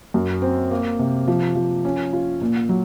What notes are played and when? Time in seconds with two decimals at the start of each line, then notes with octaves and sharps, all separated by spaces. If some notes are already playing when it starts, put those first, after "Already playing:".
0.14 F#2
0.42 C4
0.71 A#3
0.99 C3
1.28 F3
1.55 F3
1.85 C#4
2.13 F4
2.41 A#2
2.69 F#3